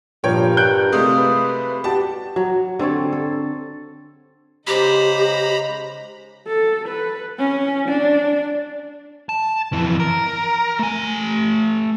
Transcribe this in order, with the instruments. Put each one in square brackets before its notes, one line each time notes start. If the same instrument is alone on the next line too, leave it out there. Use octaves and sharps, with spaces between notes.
[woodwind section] G2 [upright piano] A#2 F3 C#5 [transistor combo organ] A#4 [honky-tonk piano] G5
[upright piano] F#6 G6 D7
[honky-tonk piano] C3 G#3 A3 [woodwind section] F#3 F4 D#6
[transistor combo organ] B4
[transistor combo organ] F#4 [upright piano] G4 [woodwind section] D5 D6 [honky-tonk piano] A5
[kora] F#3
D3 C4 A4 C#5
A4
[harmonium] C#3 G#3 [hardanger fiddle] D#4 C5 [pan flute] G4 [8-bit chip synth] A#5 B5
[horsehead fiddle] A4
B4
C#4
D4
[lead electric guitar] A5
F2 E3
A#4
A3 G#5